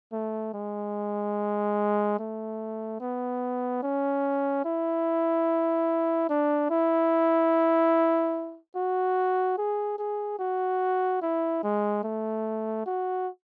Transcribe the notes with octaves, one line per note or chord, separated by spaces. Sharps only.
A3
G#3
A3
B3
C#4
E4
D4
E4
F#4
G#4
G#4
F#4
E4
G#3
A3
F#4